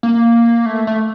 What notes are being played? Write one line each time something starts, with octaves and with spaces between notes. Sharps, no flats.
A#3
A3
A3